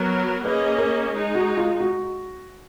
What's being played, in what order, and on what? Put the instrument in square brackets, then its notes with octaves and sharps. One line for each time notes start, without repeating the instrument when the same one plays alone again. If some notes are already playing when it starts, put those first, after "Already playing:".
Already playing: [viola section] F#3 B3 F#4 A#4
[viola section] A#3 C#4 G#4 D#5 [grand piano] B4
[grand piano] A#4
[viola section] G#3 D#4 G#4
[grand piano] F#4
F4
F#4